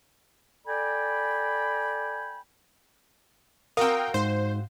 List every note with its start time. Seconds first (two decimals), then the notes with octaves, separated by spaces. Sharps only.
0.66 A4 D5 G5 G#5 B5
3.77 C4 F#4 A#4 F5 G5 D#6
4.14 G#2 C5